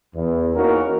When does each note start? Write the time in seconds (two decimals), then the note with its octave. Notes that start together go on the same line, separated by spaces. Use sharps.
0.15 E2
0.55 A#3 C#4 D#4 F#4 A#4